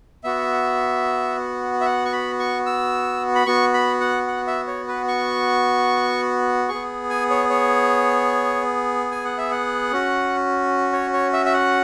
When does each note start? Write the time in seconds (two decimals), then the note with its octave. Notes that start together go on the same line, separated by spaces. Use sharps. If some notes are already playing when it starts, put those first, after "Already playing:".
0.24 B3 F#4 E5
1.81 E5
1.85 F#5
2.05 C#6
2.12 B5
2.39 C#6
2.66 E6
3.35 B5
3.46 B3 F#4 C#6
3.74 B5
4.01 F#5
4.27 F#5
4.47 E5
4.67 C#5
4.88 B4
5.08 C#6
6.69 B3 G#4 C#6
7.10 G#5
7.30 C#5
7.50 C#5
9.11 G#5
9.25 F#5
9.38 E5
9.51 F#5
9.92 C#4 F#4
10.93 C#5
11.13 C#5
11.33 E5
11.46 E5
11.53 F#5